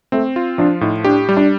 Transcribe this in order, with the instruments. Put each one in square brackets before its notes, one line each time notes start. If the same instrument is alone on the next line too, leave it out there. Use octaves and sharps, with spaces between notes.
[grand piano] A3 [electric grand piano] C4
[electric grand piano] F4
[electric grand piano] F3 [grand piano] D4
[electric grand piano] A2 [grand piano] D#4
[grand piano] D4 [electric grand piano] G4
[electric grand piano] G3
[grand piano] D4